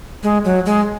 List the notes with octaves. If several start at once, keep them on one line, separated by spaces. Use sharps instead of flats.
G#3
F#3
G#3